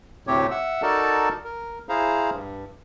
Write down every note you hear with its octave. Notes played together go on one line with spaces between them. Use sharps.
D2 A2 C3 C4 G4 C#5
E5 F#5 E6
D#4 F#4 A4 A#4 D5 A5
A#4
E4 G#4 C5 F5 A#5
G2